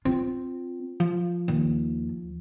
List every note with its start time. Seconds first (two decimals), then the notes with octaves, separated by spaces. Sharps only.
0.05 C4 F4
1.00 F3
1.48 D#2